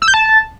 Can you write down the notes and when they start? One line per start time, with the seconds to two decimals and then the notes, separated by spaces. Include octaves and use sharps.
0.02 E6
0.08 G6
0.14 A5